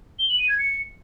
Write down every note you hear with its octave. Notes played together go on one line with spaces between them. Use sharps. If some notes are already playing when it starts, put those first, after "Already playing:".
G7
F#7
D#7
G#6
C#7